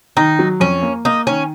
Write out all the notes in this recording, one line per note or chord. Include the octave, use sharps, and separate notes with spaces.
D#3 D#4
F#3
F2 C#4
A#3
A#3 D#4
D#3 C#4